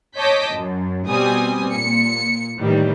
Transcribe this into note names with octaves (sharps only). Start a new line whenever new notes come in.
C#5 D#5 A5 D6 G6 B6
F#2
B2 G3 C4 G#5 D#6
A#2 C#7
A2 D#3 E3 G3